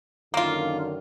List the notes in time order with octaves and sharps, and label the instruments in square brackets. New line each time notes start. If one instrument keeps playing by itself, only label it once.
[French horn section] F#2 D3 D#3 [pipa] A#3 F4